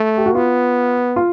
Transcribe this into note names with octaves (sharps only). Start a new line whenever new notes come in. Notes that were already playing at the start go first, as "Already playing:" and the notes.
Already playing: A3
G4
F#4
B3 F4
F4